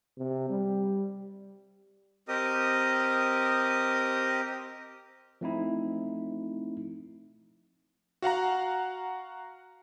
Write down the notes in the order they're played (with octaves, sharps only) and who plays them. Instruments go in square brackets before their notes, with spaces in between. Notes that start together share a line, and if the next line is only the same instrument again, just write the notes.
[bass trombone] C3
G3
[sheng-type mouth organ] C4 G4 A#4 D#5 D#6
[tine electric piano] F3 A3 C4 D#4 E4
[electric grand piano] F#4 F5 F#5 A#5